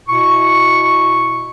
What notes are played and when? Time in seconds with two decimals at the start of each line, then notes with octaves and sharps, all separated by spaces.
0.09 B2 E4 C#6